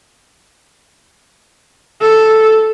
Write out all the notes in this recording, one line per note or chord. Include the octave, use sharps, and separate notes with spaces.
A4